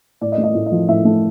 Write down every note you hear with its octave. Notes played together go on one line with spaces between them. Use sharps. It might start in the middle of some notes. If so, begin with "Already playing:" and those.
A2 D5
D#5
A3
D#5
A2
D#5
F3
A2 E5
A3